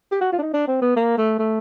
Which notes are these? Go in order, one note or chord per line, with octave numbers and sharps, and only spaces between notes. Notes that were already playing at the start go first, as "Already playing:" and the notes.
G4
F#4
F4
D4
D#4
D4
C4
B3
A#3
A3
A3